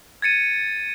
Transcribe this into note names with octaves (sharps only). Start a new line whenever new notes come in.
G#6 A6 C#7 D#7